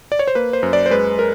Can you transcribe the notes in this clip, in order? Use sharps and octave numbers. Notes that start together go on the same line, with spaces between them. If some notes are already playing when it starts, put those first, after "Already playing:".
D5
C#5
C5
A#3 B4
C5
F#2
D5
C5
G#3 B4
A#4